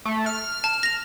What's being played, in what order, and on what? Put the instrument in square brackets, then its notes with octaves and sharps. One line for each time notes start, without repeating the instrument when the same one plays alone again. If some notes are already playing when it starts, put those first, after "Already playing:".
[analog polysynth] A3
F6
[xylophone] A5
A#6 F7